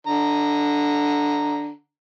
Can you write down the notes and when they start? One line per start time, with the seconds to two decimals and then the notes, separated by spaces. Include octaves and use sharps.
0.07 D3 A#5